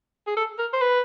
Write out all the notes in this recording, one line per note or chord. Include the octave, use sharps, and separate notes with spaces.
G#4
A4
A#4
C5
B4